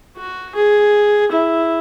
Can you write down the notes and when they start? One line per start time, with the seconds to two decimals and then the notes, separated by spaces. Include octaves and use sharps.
0.17 F#4
0.55 G#4
1.32 E4